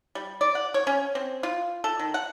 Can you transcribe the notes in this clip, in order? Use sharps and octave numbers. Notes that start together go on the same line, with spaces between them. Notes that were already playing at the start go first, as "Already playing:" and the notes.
G3
D5
F#5
C#5
C#4
C4
F4
A4
D#3
F#5